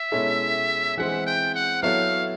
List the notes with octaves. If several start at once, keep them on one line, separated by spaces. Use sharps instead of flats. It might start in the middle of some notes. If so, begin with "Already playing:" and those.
Already playing: E5
B2 G#3 C#4 E4 A4
E3 G#3 C4 F#5
G5
F#5
F#3 B3 E4 A4 C#5 F5